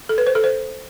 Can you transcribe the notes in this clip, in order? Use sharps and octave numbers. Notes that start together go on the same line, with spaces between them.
A4
B4
C5
A4
C5